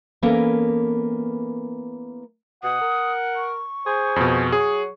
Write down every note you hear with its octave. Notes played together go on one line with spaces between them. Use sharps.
E3 A#3 B3 C#4 A4 A#4
B2 F#5 D#6
A#4
C#6
G#4 C5
F2 B2
F#3 G#4 C#5